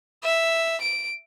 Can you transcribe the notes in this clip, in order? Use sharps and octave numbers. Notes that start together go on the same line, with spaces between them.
E5
D7